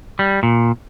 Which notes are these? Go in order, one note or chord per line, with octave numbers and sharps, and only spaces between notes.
G3
A#2